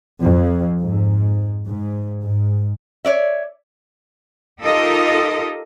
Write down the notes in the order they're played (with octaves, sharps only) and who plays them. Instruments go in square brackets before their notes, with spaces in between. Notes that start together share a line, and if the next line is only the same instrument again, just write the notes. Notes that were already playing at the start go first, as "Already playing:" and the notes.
[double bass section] F2
G#2
G#2
G#2
[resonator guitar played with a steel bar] C#5 D5 E5
[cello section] D#4 F4 G4 A4 A#4 D#5